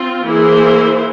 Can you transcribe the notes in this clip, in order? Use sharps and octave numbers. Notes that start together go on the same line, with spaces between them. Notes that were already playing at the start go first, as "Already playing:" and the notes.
Already playing: C4 F4
E3 A#3 E4 G#4 C5